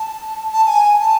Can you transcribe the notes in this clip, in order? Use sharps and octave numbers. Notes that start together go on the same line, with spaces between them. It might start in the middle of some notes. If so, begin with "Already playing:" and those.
Already playing: A5
A5
A5
G#5
A5